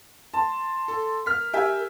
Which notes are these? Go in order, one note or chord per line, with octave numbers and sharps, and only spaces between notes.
A5 C6
A4
A#4 F6 B6
G4 E5 G#5